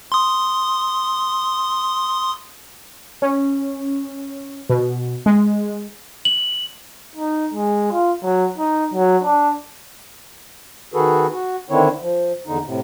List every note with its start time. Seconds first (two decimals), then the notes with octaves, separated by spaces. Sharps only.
0.12 C6 D#6
3.22 C#4
4.69 B2
5.26 G#3
6.25 F#7
7.15 D#4
7.54 G#3
7.92 F4
8.23 F#3
8.58 D#4
8.94 F#3
9.23 D4
10.94 D#3 F#4 G#4 A4 B4
11.32 F#4
11.70 D3 D#3 C4 D4 E4 C#5
12.01 F3
12.47 E2 D3 D#4
12.65 A2 C3